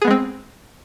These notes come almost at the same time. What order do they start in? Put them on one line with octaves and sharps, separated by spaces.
G#4 B3 G#3 C4